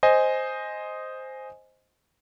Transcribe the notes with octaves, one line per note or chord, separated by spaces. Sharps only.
C5 D#5 G#5